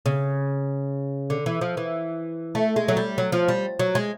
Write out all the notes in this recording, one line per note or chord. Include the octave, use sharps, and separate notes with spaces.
C#3
D3
E3
F3
E3
A3
G#3
F#3
G3
F#3
F3
G3
F#3
G#3